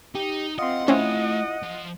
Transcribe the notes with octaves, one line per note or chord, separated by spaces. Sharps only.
D#4 G4
C4 F4 D#5 F#5 C6
A3 C4 C#4 E4 F4 D#5 F#5 G#5
F3